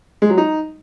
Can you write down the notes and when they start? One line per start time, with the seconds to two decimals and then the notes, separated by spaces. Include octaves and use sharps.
0.22 G#3
0.30 F#3
0.38 D#4